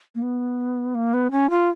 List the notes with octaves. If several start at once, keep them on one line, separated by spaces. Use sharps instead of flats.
A#3
B3
A#3
B3
C#4
F4